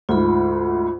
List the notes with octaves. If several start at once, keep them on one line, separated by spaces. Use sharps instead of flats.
D2 G#2 F4 B5